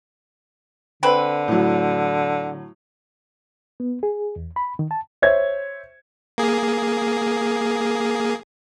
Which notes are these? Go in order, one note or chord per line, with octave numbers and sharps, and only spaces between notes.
D3 C4 B4
A2 F#3
B3
G#4
E2
B5
D#3
A5
C5 C#5 E5 G#6
A#3 G#4